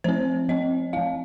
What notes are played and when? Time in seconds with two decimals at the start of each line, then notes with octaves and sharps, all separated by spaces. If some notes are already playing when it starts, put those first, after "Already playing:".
0.04 F3 C4 C5
0.49 F3 C4 D#5
0.93 F3 C4 F5